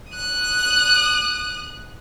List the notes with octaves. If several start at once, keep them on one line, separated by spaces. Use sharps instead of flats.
D#6 F#6